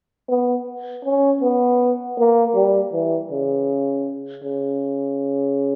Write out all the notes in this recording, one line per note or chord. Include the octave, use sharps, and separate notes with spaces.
B3
C#4
B3
A#3
G3
E3
C#3
C#3